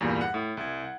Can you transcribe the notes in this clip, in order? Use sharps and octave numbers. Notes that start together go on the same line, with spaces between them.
E2 G2 A#2 G3
F#5
A2
C2 G#6
F#5